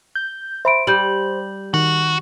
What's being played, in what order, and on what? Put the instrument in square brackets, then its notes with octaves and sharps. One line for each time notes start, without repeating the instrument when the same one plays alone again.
[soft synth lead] G6
[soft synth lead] C5 [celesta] E5 B5 D7
[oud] G3 [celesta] G6 F#7
[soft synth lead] D#3 [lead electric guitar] F#4